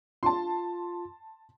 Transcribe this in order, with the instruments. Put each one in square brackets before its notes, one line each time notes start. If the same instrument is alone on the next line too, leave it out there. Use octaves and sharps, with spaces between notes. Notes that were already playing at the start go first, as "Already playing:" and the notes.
[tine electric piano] F4 [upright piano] A5 C6